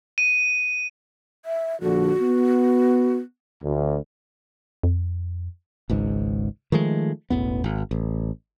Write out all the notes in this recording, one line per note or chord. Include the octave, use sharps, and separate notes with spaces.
D#7
E5
A#1 D3 F#4
B3
D2
F2
G#1 C#2 G#2
D#3 F3 G#3 A3
E1 A1 E2 B3
G#1
A1